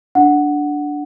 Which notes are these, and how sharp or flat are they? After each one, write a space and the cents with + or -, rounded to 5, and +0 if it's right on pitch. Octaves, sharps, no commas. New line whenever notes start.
D4 +0 F#5 +0